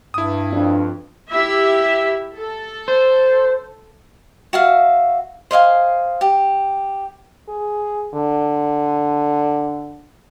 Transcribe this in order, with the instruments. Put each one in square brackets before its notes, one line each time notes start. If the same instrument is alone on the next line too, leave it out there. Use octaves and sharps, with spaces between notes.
[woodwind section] G2 [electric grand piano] E4 D#6
[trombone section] F2 [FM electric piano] D4
[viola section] E4 G4 E5
A4
[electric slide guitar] C5
[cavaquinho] F#4 E5 F5
C5 D#5 F5 G#5
G4
[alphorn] G#4
D3